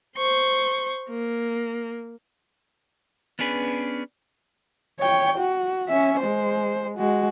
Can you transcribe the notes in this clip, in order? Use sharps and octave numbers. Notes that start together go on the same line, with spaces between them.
C5 C#6
A#3
B3 C#4 D4 G#4 B4
C#5 G5
F#4
C#4 E5
G#3 C5
G#3 F#4